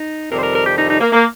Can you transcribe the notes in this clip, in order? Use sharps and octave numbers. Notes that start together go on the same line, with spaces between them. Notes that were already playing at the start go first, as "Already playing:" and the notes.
Already playing: D#4
F2 C3 D#3 G3 A#4
C5
A#4
A#4
G4
D#4
D#4
A#3
A#3